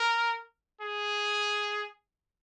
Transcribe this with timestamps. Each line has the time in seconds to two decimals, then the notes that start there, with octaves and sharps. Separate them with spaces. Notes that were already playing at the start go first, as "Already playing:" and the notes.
Already playing: A#4
0.81 G#4